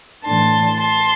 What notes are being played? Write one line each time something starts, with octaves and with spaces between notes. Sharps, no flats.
A2 E3 A3 D4 A5 C6
A5 C6